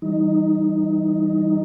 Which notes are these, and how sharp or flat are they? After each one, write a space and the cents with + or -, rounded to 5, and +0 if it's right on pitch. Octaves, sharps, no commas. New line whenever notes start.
E3 +0 G3 +0 D#4 +5